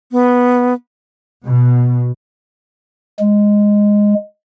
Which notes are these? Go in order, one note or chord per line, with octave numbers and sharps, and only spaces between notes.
B3
B2
G#3